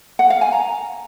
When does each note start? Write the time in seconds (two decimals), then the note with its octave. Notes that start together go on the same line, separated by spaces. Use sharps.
0.19 F#5
0.30 F5
0.41 G#5
0.53 A#5